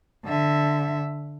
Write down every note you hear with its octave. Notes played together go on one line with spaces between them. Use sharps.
D3 E5